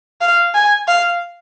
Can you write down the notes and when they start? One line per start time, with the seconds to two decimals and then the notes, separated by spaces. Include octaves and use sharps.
0.21 F5
0.54 G#5
0.88 F5